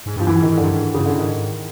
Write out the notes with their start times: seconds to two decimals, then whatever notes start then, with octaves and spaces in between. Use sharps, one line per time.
0.06 G#2
0.16 G2 F3
0.26 F#2 E3
0.38 G#2
0.42 D#3
0.50 G#2
0.57 G2 D3
0.72 G#2
0.94 G2 C#3
1.06 D3
1.18 G#2 D#3